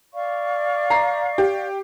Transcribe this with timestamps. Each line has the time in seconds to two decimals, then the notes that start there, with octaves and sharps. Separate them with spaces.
0.14 D5 F5 C#6
0.90 A#5 C7
1.38 G4